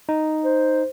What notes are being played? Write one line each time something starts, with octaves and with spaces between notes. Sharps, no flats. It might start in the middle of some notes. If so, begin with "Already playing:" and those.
D#4
C5